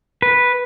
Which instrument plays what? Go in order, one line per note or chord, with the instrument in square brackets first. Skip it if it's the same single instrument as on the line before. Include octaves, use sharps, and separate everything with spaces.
[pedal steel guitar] B4